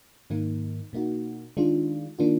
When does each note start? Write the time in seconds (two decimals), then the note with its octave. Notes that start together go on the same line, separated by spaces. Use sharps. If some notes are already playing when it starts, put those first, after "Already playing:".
0.30 G#2 D#3 A#3 D#4
0.93 B2 A#3 D#4 F#4
1.57 D#3 G#3 D4 F4
2.19 D#3 A#3 D4 F4